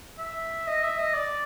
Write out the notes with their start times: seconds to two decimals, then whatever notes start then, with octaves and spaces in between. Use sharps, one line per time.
0.19 E5
0.67 D#5
0.83 E5
0.99 D#5
1.14 D5